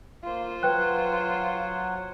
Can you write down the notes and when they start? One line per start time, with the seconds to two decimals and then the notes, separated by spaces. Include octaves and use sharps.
0.24 A#3 F4 C5
0.63 F#3 B4 C#5 F#5 G5 F#6